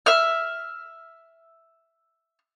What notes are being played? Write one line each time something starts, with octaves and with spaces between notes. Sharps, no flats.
E5 F6